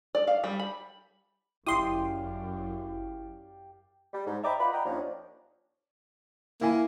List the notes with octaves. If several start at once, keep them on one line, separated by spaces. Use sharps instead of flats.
D5
F5
G3
B5
G1 F#2 E4 G4 D5 F5 C6 D#6
G3
G#2
D#5 E5 G5 A#5 B5 D6
F4 D5 F#5 B5
D#5 F#5 G5 A#5
D#2 D#3 F3 A#3 C#4 D4
A#3 E4 G#5